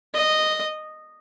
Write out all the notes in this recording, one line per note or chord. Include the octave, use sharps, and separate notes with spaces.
D#5